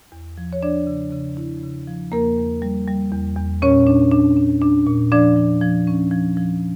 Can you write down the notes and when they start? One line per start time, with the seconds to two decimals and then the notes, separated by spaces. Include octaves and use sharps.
0.12 E2
0.38 F3
0.53 C#5
0.62 F3 D4 D5
0.87 C#3
1.12 C#3
1.37 E4
1.63 C#3
1.88 F3
2.12 E2 A#3 A#4
2.38 E2
2.62 G3
2.88 G3
3.12 E2
3.37 E2
3.62 A#2 C#4 C#5
3.87 D4
4.11 D4
4.37 D4
4.62 D4
4.87 A#2
5.12 F3 D4 D5
5.36 F3
5.62 F3
5.87 C#4
6.12 F3
6.37 F3